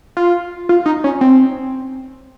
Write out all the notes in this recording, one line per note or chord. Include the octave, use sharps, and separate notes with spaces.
F4
F4
D#4
C#4
C4